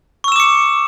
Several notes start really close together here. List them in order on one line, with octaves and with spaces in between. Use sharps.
C#6 E6 E7 D6 C#7